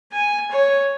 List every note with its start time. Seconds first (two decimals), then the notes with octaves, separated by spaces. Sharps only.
0.12 G#5
0.51 C#5